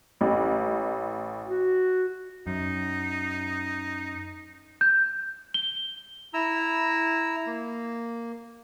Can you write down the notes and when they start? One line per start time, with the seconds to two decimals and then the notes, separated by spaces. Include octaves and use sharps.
0.21 A1
1.46 F#4
2.47 F#2 D#4
4.81 G6
5.54 G7
6.34 E4 A#5 E6
7.47 A#3